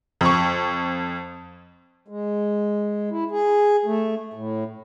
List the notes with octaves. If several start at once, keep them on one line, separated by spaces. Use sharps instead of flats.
F2 C#6
G#3
E4
G#4
A3
A2